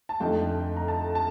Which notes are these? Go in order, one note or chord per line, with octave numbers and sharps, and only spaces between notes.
A5
F2 D3 A3 D#4 G5
A#5
A5
A5